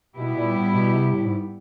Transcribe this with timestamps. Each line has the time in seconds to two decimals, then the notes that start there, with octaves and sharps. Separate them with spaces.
0.16 B2 G3 B3 E4 G4
0.35 A#2
0.55 A2
0.74 B2
0.93 C3
1.13 A2
1.25 G#2